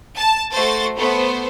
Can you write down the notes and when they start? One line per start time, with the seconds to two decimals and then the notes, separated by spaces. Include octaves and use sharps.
0.17 A5
0.53 A3 F#4 C5 A6
0.97 A3 B3 C5